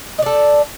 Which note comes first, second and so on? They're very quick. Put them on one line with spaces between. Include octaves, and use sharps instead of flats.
D#5 D5 A4